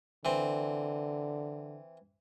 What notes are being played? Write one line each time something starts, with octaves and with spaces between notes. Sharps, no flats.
D3 E3 C4